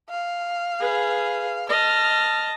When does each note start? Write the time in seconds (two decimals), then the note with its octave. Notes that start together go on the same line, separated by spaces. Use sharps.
0.10 F5
0.80 G#4 B4
1.69 D#5 A5 F6